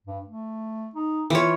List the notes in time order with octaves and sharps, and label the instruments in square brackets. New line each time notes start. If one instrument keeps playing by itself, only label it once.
[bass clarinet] G2
A3
D#4
[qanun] E3 C#5 [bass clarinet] F4